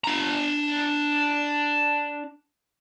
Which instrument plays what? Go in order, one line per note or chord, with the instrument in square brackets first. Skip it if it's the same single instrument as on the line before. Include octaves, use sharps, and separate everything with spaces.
[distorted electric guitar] D4 A#5